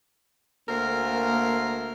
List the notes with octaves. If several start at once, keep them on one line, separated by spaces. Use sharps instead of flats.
D2 A#3 A#4 C5